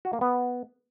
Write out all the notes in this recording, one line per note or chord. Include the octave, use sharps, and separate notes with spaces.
F#4
A#3
B3